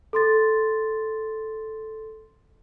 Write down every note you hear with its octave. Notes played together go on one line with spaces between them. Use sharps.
A4 C6 A6